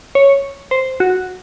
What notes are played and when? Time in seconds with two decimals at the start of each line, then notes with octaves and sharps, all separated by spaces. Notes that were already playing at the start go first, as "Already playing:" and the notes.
0.15 C#5
0.71 C5
1.00 F#4